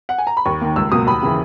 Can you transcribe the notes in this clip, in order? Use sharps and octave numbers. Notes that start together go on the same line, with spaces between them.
F#5
G#5
A#5
B5
D#2 C#6
D#3 A#3
C#2 E6
B2 F#3 A#3 D#6
D#2 B5
C#3 E3